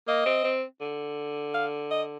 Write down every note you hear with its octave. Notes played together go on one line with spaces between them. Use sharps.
A#3 D#5
C4
C4
D3
F5
D#5